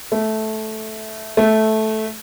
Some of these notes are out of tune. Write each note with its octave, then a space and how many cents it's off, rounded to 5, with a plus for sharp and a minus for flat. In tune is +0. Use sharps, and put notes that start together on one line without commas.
A3 -10
A3 -10